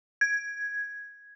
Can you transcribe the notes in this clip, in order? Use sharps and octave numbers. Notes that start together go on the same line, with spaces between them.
G#6